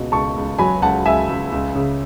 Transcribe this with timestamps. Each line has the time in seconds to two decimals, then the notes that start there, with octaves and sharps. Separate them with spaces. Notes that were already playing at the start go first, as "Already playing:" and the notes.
Already playing: C#2 B2
0.12 C#2 A5 C#6
0.36 C#2
0.58 F#3 G#5 B5
0.82 C#2 F#5 A5
1.05 C#2 E5 G#5
1.29 C#2
1.52 C#2
1.75 C#3